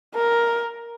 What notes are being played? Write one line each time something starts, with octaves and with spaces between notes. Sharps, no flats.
A#4